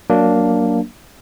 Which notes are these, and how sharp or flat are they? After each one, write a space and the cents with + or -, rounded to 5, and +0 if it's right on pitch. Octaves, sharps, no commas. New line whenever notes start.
F#3 +0 A#3 +0 D4 +0